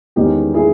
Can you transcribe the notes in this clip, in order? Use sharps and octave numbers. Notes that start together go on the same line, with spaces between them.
E2 D#3 G#3 C#4 D#4 G4
E4 G#4